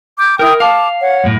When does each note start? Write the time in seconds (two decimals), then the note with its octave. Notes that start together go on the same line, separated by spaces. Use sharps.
0.18 D6 G6
0.39 E4 A#4 G5 D#6
0.60 F5 A5 D6
1.02 C#5 F#5
1.24 F#2 A2